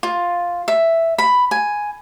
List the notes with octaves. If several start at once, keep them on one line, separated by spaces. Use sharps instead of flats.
F4
E5
B5
G#5